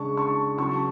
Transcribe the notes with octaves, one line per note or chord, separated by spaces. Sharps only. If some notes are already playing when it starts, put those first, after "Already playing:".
Already playing: C#3 G#3 D4 A5 C#6
A5 C#6
C#3 F#3 C#4 A5 C#6